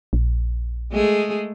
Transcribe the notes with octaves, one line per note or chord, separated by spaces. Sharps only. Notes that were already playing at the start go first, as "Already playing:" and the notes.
A#1
G#3 A3 G#4